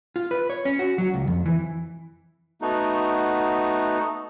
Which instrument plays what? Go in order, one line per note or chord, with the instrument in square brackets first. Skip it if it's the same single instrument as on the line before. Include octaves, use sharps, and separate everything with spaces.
[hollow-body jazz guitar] F4
B4
C#5
C#4
F#4
F#3
C#2
F2
E3
[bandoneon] A3 B3 D#4 F#4